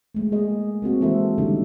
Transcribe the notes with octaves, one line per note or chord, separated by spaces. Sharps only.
G#3 A3
A#3 G#4 D#5
A#3 C4 F#4 G#4
E3 G#3 E4 A4 C5 E5
D3 G3 C#4 D#4